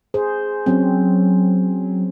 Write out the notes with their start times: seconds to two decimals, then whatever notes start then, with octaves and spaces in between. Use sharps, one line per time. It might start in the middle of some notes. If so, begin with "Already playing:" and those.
0.14 G#4 C5
0.66 F#3 C4 C#4